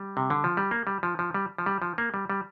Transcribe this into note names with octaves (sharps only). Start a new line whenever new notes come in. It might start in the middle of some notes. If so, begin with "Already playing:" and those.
Already playing: G3
C3
D3
F3
G3
A#3
G3
F3
F3
G3
F3
G3
F3
A#3
G3
G3